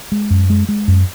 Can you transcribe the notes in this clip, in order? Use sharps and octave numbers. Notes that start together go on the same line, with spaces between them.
G#3
F#2
G#3
G#3
F#2